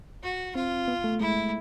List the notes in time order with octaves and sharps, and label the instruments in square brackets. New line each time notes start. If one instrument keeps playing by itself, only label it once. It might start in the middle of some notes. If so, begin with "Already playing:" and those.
[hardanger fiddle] F#4
[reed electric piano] C4 [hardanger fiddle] F4
[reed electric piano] B3
A3
[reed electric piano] G#3 [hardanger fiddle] E4